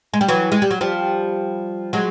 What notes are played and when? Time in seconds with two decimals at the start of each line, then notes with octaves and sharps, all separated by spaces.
0.14 G#3
0.21 G3
0.28 E3 F#3
0.52 G#3
0.62 G3
0.71 F#3
0.81 F3 G3
1.93 F#3 G#3